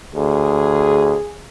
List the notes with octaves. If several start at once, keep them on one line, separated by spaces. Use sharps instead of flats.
D2 G#4